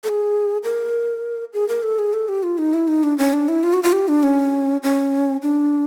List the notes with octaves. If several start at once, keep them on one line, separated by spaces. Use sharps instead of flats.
A4
G#4
A#4
G#4
A#4
A4
G#4
A4
G4
F4
D#4
E4
D#4
D4
C#4
D4
E4
F4
F#4
F4
G4
D4
C#4
C#4
D4